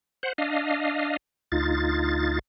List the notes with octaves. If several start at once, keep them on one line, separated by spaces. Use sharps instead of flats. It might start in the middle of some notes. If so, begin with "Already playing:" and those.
C5 F#5
D4 D#5 F5
D2 D#4 F4 A6